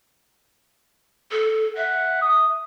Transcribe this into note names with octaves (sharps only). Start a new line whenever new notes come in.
A4
E5 F#5
D#6